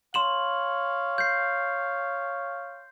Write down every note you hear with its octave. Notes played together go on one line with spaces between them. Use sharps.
C#5 F5 C6 E7 F#7
G6 C7